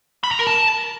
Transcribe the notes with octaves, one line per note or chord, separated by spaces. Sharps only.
B5
A#5
A#4
A5